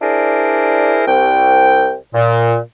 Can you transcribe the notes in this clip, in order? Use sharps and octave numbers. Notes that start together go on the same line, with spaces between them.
D4 E4 G#4 A#4 C5 D5
C2 G5
A#2